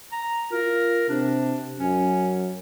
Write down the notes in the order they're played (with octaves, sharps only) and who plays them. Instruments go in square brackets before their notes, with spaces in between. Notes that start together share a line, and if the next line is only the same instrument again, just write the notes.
[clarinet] A#5
[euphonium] F4 [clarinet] A#4
[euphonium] C3 [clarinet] D4
[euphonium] F#2 [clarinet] C#4